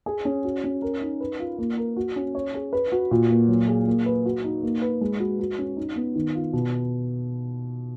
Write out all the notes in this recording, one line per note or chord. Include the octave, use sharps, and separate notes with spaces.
G#4
C#4
F#4
C#4
A#4
D#4
B4
F4
A#3
A#4
F#4
C#4
C#5
G#4
B4
F#4
A#2
A#3
F#3
G#4
A#3
B4
F#4
D#4
A#3
B4
G#3
F#4
F#4
C#4
D#4
B3
D#3
F4
B2